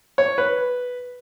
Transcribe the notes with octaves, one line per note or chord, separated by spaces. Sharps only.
C#5
B4